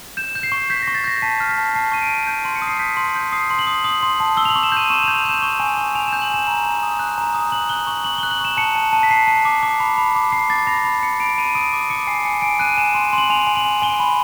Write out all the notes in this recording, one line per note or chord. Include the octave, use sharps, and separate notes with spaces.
G6 E7
G6
C7
C#6
G6 B6
A#6
C#6
A6
G6 A#6
A5 B6
F6
B6
A5
A5 C7
C#6 D#7
D7
A5
G6
C6
C#7
D#6
C7
G6 B6
C6
G6
D#6 C7
C6
F#7
D#6
D#6 F#7
C6
A5
E6 G7
F7
F#7
C#6
E7
G6 D#7
C#6 E7
F7
G6
F7
G6 E7
C#6
G#5
C#6
G#5 F7
E7
G6
F#7
G#5 E7
A#5
A#5
D#6
F#6
A#5
D#6
F#6 F#7
F#6 G7
C#6 F#7
C#6 F#7
G7
F#6
F#7
C#6 E7
A5 C#7
A5
A5
B6
A5 C7
A5
D6
D6
B5
B5
D6
D6 C7
D6 A6
B5 A#6
B5
B5 C#7
B5 D7
B5 D#7
D#6 D7
D6
D6 C#7
G#5 C7
G#5 C#7
G#5 D7
F#6 D#7
G#5 E7
C6
C6
F#7
G#5 F7
G#5
F#7
G#5
G#5 G7
B5